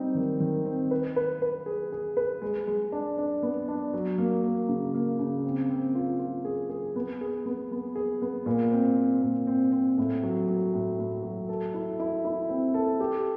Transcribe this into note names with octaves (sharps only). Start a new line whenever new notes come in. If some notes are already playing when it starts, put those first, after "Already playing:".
Already playing: G3 C4 D#4
D#3
D#3
C4
B4
B4
B4
G#4
G#4
B4
G#3
G#3
D4
D4
B3
D4
F#3
A#3
A#3
C#3
A#3
C#3
C4
C4
F4
F4
G#4
G#4
B3
G#4
B3
B3
G#4
B3
A#2
C4
C4
A#2
C4
C4
A2
F#3
F#3
A2
A2
F#3
A4
E4
E4
E4
C4
A4
G4